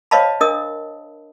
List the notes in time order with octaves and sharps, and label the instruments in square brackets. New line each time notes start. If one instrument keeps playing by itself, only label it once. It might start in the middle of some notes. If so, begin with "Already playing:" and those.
[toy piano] C5 C#5 D#5 F5 A5 B5
D4 A#4 D#5 D#6